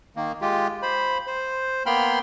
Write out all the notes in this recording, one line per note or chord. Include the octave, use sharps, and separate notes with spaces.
D#3 A#3
G#3 F4 G4
C5 B5
C5
A#3 B3 G5 B5 C6 F6